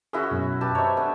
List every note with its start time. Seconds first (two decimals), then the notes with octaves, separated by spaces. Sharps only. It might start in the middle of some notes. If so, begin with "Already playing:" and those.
0.13 C#4 E4 F#4 G#4 A#4 E5
0.31 F#2 B2 F#3
0.61 G4 B4 A5
0.75 C5 C#5 D#5 E5 A#5
0.97 A3 B3 D4